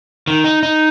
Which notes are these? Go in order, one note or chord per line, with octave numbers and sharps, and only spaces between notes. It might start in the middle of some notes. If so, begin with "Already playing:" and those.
D#3
D#4
D#4